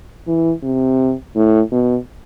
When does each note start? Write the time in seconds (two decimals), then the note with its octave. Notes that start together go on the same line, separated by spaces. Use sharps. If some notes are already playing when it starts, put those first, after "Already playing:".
0.27 E3
0.63 C3
1.35 A2
1.72 B2